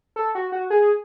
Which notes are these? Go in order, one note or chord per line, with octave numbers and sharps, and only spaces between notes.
A4
F#4
F#4
G#4